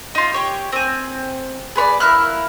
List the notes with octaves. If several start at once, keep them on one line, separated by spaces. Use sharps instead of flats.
D#4 F4
G4 C#5 G5
C4 G#5
G#4 B4 C#5 D5
A#3 E4 F6 F#6